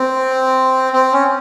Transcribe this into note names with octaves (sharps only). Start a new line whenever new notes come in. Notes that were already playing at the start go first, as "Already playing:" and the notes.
Already playing: C4
C4
C#4